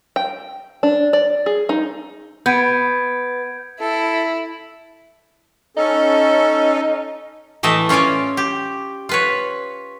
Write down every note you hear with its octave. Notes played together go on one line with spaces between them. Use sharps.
G5
D4
D5
G#4
D#4
B3 G6 G#6 D7
E4 A4
C#4 D#4 A4
A2 E3 A3 D#5 E5 A5
C#4 F4 C#5 D5 G#5
G4
F4 B4 C#5